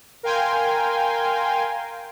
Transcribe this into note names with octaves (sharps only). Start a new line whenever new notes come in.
A#4 F5 G5 G#5 C6